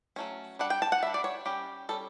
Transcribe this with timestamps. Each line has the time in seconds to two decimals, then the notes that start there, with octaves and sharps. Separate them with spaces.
0.16 F#3 A3 C#4
0.59 G3 D4 F#5
0.70 G5
0.82 A5
0.92 F#5
1.03 G3 D4 E5
1.14 D5
1.24 C#5
1.46 G3 C#4 G4
1.89 G3 C#4 A4